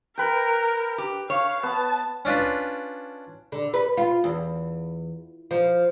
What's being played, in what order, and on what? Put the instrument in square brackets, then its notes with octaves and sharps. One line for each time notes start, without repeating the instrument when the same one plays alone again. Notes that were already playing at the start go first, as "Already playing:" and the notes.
[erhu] A#4 [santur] B4 G5
[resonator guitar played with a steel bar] G4
[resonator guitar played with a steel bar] C#5 [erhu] F5
[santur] B3 [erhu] A5
[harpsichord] C#4 D4 F4 B4
[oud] D3
B4
F4
E2
F3